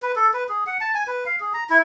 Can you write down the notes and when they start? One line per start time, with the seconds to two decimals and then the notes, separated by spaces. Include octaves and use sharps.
0.03 B4
0.16 A4
0.34 B4
0.49 G#4
0.67 F#5
0.81 A5
0.95 G#5
1.07 B4
1.26 F5
1.40 G#4
1.54 A#5
1.70 E4